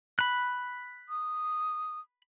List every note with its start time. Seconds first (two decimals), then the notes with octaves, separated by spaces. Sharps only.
0.19 B5 F#6
1.09 D#6